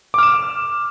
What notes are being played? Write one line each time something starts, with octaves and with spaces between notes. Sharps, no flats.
D6 F6 E7